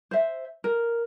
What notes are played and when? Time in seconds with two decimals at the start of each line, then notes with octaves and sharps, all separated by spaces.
0.11 C5 E5
0.64 A#4